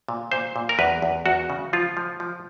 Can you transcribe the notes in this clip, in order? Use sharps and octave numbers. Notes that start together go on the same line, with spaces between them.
A#2
A#2 C5
A#2
A#4
E2 B4
E2
E2 F#4
C#3
F3 F4
F3
F3